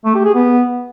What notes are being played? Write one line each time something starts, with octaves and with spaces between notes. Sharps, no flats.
A3
G4
G#4
B3